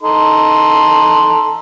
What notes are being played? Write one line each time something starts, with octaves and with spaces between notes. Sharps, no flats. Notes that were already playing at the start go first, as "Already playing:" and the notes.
D#4 A4 C6